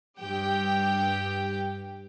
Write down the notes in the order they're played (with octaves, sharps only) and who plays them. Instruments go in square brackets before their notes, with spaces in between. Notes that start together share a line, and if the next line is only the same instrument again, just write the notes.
[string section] G2 G4 G5